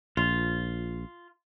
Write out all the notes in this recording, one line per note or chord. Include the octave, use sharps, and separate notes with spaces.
A#1 F4